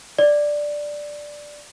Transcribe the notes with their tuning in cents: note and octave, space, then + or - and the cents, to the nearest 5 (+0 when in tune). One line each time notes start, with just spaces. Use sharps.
D5 +5